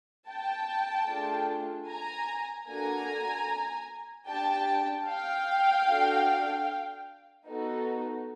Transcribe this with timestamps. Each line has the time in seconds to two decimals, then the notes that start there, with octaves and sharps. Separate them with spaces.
0.28 G5 A5
1.08 A3 D4 F4 G#4
1.88 G#5 A#5
2.68 A#3 D4 F#4 A4 G#5 A#5
4.28 D4 G4 G5 A5
5.08 F5 G5
5.87 D4 F#4 A4
7.47 B3 D#4 F#4 A4